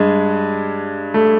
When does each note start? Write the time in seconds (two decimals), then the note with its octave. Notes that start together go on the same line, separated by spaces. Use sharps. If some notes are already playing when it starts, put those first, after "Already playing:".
Already playing: G2 G#3
1.14 A3